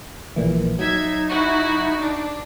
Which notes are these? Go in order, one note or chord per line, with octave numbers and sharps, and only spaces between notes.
A#1 A#2 E3
F#3 D#4 E5 G#6
E4 F#4
D4